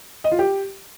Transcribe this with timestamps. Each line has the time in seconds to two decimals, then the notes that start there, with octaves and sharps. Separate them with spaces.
0.24 D#5
0.31 F4
0.39 G4